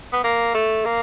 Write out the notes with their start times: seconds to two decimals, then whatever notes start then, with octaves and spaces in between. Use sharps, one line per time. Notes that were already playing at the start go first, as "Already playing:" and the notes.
0.13 B3
0.24 A#3
0.54 A3
0.85 A#3